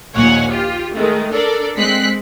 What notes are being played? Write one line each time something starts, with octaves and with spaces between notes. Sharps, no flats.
A#1 D#2 A#2 C#5 F#5 G#5
F4 G4
D#3 G#3 A3
D4 A4 A#4 D5
G#3 C4 F#6 B6 C7